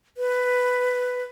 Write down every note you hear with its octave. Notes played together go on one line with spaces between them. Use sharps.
B4